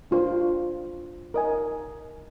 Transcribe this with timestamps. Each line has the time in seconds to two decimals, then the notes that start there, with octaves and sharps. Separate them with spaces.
0.11 D4 F4 C5
1.34 A#4 D#5 G#5